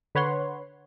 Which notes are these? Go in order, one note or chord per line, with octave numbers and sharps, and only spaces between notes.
D3 B4 C#5 F#5 C6